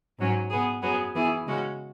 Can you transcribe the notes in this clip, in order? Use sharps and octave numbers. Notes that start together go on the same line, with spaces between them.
G#2 F#3 C#4
B2 B3 G#4
F#2 F#3 B3 G#4
E3 B3 E4 G#4
C#3 G#3 C#4 F#4